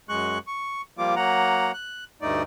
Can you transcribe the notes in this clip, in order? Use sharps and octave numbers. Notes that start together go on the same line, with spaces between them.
F#2 G#3 C#6 F#6
C#6
F3 G3 A#3 F4 D6
F#3 A#3 F#5 A#5
F#6
D2 G2 A3 D#4 D5